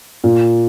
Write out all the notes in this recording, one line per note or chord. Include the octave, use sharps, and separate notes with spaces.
A#2